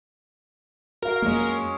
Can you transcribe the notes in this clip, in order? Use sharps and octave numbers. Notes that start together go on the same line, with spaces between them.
F#4 A#4 F5
F2 F#3 G#3 A#3 C#4